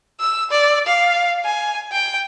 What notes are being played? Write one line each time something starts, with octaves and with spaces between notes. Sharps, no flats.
E6
D5
F5
G#5
G5